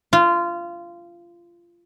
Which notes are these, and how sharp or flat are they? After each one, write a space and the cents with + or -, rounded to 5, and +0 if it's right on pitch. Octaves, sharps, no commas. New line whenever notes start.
F4 -20